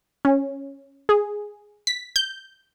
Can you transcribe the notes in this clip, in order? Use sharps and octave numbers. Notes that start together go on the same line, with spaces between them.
C#4
G#4
B6
G6